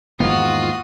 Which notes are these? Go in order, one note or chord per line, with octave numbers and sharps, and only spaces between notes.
E2 G#2 D#3 A#3 B3 F4 F#4 D#6